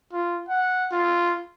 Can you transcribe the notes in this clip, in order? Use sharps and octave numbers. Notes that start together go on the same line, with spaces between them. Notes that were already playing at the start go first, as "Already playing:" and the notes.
F4
F#5
F4